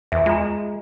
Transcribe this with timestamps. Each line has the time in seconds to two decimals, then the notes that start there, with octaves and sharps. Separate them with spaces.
0.12 E2 E5
0.26 G#3 F4 A#5